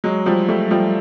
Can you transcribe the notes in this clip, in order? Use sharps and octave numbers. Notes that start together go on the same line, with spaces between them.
F#3 G#3
F3 G3
G3 A3
F3 G3